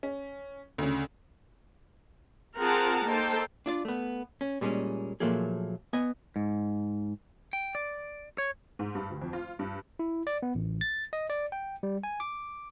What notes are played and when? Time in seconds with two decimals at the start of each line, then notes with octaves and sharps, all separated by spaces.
0.03 C#4
0.78 D2 C#3
2.61 C4 F4 G#4 A#4 F#5 A5
3.06 A#3 D#4 A4 C5 G5 A5
3.66 D4 F4 D5
3.85 A3 B3
4.41 C#4
4.61 A#2 G3 G#3 C4 C#4
5.20 A#2 F3 F#3 A3 A#3 G#4
5.93 B3 D#5 G#5
6.36 G#2
7.53 G5
7.75 D5
8.38 C#5
8.79 G#2
8.95 G2
9.10 D2
9.22 F2
9.33 F4
9.59 G2
9.99 E4
10.27 D5
10.43 B3
10.55 A1
10.81 A6
11.13 D#5
11.30 D5
11.52 G5
11.83 G3
12.04 G#5
12.20 D6